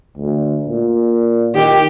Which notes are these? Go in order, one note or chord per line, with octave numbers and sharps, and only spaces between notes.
D2
A#2
D#3 G4